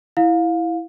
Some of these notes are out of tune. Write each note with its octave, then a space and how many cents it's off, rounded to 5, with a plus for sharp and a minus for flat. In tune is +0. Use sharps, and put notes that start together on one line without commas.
E4 +0 F5 +20